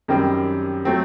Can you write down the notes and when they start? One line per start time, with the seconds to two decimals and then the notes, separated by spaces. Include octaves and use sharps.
0.08 F#2 D#3 G3 C4
0.85 F#3 A3 C4